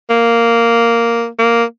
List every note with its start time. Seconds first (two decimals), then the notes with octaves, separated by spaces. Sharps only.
0.10 A#3
1.39 A#3